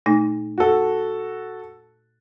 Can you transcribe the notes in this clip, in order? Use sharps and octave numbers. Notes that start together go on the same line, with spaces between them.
A#2 A3 D#4
F#4 A4